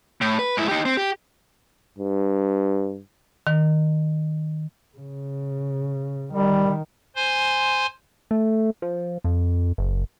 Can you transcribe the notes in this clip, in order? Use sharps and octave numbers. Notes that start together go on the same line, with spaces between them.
A2
B4
G#2 E4
D#4 G4
C4
G4
G2
D#3
C#3
D#3 G3
C5 G#5 C6
A3
F3
F2
F#1